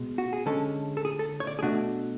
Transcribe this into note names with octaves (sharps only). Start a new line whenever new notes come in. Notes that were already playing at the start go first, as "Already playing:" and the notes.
Already playing: B2 G#3
F#4
G#4
D3 G#3 C#4 A4
A4
G#4
A4
C#5
D5
G#4
B2 A3 D4 F#4